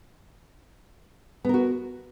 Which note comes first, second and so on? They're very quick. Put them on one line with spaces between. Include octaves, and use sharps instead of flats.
B3 A#4 F#4